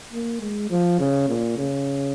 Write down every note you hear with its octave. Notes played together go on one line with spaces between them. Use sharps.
A#3
G#3
F3
C#3
A#2
C#3